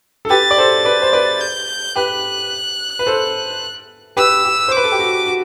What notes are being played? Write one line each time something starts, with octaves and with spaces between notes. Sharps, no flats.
A4
G4 B4 A6
D5
A4 C5
B4 D5
C5
B4 D5
G6
G4 B4 F#6
B4
A4 C5
G4 B4 E6
G4
C5
B4 D6
A4
G4
F#4
F#4